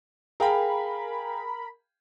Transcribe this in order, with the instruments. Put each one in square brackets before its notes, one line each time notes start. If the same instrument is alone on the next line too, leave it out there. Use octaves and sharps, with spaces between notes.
[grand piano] G#4 F5 G5 [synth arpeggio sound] A#4 B5